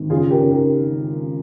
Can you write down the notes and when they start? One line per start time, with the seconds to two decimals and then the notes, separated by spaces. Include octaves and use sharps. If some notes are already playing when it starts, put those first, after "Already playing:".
Already playing: G#1
0.10 C#3 F4 G#4
0.31 G4 A#4
0.41 C#3
0.51 G4 A#4